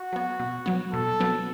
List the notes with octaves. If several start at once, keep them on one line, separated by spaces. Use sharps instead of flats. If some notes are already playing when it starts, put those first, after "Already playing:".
Already playing: F#4
F#3 B3
B2
F#3 B3
B2 A4
F#3 B3